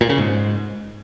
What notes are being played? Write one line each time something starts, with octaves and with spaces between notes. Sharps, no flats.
A#2
C#3
G#2